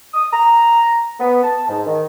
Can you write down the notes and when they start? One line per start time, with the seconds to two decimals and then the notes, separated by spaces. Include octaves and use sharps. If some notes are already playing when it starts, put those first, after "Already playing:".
0.13 D#6
0.33 A#5
1.20 B3
1.42 A5
1.69 G#2
1.86 D#3